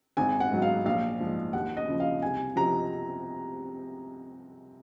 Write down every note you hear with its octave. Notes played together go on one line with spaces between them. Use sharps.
G#1 G#5
F#5
G#2 F#3
F5
A#1 F5
G#2 F3
D#2 F#5
D#5
C#3 F3
F5
C2 G#5
C3 F3 A#5